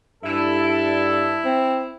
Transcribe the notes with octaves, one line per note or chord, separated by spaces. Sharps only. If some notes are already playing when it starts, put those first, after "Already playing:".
G2 E4 A4
C4